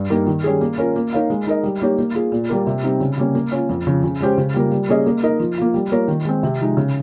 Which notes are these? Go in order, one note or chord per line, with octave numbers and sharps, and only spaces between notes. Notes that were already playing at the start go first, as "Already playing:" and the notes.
Already playing: G2
G3 A#3 D#4 A#4
D#3
G3 C#4 G#4
A#3
C#4 F4 A#4
A#3
D#4 A#4 C#5 F5
G#3
D#4 A#4 D#5
G3
A#3 D#4 G4 C#5
A#3
F4 G#4
A#2
G3 A#3 F4 A#4
C3
G3 C4 D#4
C#3
G3 A#3 C#4
A#3
C#4 F4
F2
C#3 F3
C#3
G#3 C#4 G4 C5
C#3
G3 A#3 F4 A#4
G3
A#3 C#4 G#4 D#5
A#3
D#4 A#4 D#5
F3
A#3 F4
G3
A#3 F4 A#4 C#5
D#3
G#3 C4
C3
F3 G#3 D#4
C#3